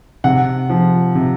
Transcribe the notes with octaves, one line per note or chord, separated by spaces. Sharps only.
C3 F#5
F3
C3